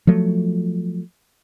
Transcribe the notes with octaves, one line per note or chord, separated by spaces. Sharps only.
F3 F#3 A3